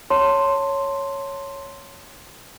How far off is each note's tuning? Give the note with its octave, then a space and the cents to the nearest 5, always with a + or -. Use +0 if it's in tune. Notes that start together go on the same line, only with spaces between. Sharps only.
C#5 +0 A5 +25 C6 +0